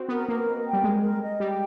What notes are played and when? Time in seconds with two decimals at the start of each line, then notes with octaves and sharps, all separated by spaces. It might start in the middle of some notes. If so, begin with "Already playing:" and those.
Already playing: C4 F#4
0.09 B3 A#4
0.28 A#3 A#4
0.47 D#5
0.66 G5
0.73 G3
0.84 G#3 A#4
1.03 A#4
1.22 D#5
1.40 G3 G5